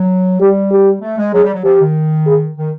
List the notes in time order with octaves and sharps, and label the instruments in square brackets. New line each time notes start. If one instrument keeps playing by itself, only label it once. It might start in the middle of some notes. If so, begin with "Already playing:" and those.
Already playing: [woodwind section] F#3
[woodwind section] G3 [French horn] G4
[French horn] G4
[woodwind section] A3
G#3
[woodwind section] F#3 [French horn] G#4
[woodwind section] G3
F#3
[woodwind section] F3 [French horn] G4
[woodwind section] D#3
[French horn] G#4
[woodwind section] D#3